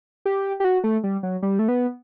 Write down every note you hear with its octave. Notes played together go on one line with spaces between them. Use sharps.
G4
G4
F#4
A3
G3
F#3
G3
A3
B3